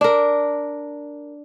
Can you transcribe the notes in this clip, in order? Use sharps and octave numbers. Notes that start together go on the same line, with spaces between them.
D4 A#4